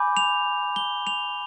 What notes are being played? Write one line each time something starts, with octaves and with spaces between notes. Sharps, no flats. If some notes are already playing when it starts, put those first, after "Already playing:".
Already playing: G#5 B5 D6 G6
F7
G7
F7